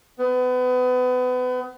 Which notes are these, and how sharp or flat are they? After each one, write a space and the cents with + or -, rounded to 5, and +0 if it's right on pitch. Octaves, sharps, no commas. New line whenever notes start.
B3 +30